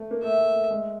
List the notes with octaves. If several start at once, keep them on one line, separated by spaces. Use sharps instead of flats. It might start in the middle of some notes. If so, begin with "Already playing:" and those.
Already playing: A3
A#3
A3 E5
A3
A3
G#3